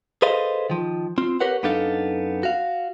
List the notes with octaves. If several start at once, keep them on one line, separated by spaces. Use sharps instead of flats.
G#4 A4 B4 C5 D#5 F5
D#3 F3
C4 F4
G4 A#4 B4 C#5 F#5
F#2 B3 D4 D#4 A4 F5
F#4 F5